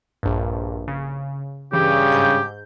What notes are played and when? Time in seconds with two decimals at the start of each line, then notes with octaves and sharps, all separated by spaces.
0.23 A#1 G2
0.88 C#3
1.73 G2 C#3 E3 G4
2.12 G#2 G6